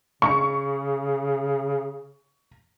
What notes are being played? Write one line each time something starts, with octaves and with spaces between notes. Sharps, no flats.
C#3 C#6